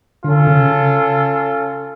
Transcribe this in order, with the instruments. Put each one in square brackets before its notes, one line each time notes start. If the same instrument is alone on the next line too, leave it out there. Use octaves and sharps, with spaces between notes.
[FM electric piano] D3 [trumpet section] C#4 F4 A4
[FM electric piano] C#3